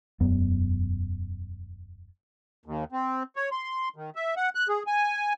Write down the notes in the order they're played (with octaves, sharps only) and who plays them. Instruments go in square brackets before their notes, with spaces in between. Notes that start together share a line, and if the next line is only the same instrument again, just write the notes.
[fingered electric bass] E1 F#2 B3
[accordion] D#2
C4
C#5
C6
D#3
E5
F#5
F#6
G#4
G#5